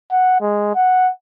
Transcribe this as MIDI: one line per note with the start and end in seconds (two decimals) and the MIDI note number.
0.11 0.41 78
0.41 0.73 56
0.75 1.10 78